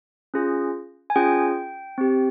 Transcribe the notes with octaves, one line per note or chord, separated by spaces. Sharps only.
C#4 F4 G#4
G#5
C#4 F4 G#4 G5
C4 G4